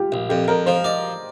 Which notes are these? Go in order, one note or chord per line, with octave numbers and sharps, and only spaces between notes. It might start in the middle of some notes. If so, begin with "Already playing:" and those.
Already playing: F4 G4
A#1
F2 G4
F2 A#4
F3 C5
D5 D#5